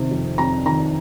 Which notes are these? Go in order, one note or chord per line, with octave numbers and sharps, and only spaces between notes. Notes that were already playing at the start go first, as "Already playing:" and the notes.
Already playing: C3 D#3
F2
F2 A#5
D#3 A#5